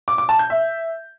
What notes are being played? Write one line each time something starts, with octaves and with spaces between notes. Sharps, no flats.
D6
D6
A5
G6
E5